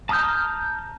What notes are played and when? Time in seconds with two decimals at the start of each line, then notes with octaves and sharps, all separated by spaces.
0.09 A5 A#5 D#6 F6 G6